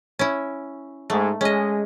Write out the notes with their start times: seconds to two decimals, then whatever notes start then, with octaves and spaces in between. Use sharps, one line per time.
0.19 C#4 E4
1.10 G#2 A3
1.41 G#3 C#4 D#5